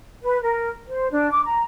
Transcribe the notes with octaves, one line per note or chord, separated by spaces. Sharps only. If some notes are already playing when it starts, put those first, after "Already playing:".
B4
A#4
C5
D4
D6
A#5